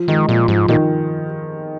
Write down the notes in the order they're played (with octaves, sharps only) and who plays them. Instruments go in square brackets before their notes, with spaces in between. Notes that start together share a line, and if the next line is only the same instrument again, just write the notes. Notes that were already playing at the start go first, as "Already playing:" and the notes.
Already playing: [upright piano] F3
[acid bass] D#3 [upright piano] G#3
[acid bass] A#2 [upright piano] F3
[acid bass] G#2 [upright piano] F3
[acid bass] A#2 [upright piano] D#3